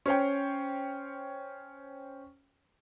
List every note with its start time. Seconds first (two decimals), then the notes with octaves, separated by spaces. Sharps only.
0.06 C#4 C5 C#5 G5